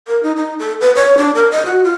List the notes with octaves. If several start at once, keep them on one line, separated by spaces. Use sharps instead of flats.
A#4
D#4
D#4
A4
B4
C#5
D4
A#4
D#5
F#4
F4